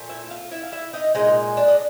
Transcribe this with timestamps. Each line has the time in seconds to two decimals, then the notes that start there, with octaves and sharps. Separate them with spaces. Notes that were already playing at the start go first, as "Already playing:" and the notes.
Already playing: A#2 F3 A3
0.10 E4 E5
0.30 F4 F5
0.51 E4 E5
0.64 F5
0.72 E4 E5
0.93 D#4 D#5
1.15 A#2 F3 G#3 D#4 D#5
1.57 D4 D5
1.68 D#5